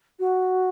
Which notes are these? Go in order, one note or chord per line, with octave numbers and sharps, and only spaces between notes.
F#4